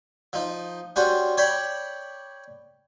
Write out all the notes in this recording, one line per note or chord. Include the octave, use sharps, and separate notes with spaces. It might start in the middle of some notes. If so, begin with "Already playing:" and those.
F3 D#4
G3 C#4 D4 F#4 C5
C#5 D5 G5 A5 B5